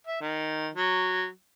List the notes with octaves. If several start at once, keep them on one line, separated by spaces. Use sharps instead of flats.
E5
D#3
F#3